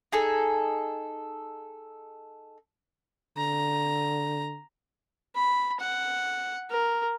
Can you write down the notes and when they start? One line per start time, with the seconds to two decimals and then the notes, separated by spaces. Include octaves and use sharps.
0.12 D#4 G#4 A4
3.37 D3 A#5
5.35 B5
5.80 F#5
6.70 A#4